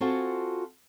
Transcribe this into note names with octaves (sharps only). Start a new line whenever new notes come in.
C4 F4 F#4 A4 G#5 A5